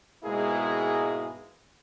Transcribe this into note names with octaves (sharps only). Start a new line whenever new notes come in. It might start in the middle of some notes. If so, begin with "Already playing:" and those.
G#2 B2 G#3 A#3 E4 G#4